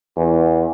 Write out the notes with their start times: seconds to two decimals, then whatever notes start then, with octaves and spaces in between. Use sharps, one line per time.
0.16 E2